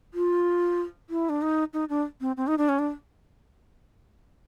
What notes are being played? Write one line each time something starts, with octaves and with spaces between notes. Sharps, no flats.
F4
E4
D4
D#4
D#4
D4
C4
C4
D#4
D4
C#4
D4